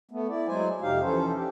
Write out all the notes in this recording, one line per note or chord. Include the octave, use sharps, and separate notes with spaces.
A3 B3
E4 D5
F#3 G#3 C5 G#5
F2 C3 D#4 G4 F5
E3 F3 C#4 A4 C5
D4 G4